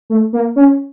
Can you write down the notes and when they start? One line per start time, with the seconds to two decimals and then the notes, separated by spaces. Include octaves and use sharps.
0.10 A3
0.33 A#3
0.56 C#4